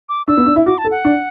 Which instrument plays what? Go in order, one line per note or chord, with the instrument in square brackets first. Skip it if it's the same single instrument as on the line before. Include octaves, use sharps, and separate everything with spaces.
[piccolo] D6
[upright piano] D4 [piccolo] E6
[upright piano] B3
D4
E4
[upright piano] F#4 [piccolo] D6
[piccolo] A5
[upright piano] A4
[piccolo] F#5
[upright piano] D4